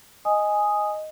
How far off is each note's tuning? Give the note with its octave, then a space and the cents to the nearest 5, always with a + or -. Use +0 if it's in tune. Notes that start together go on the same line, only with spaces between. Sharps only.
D#5 +0 G#5 +0 D#6 +0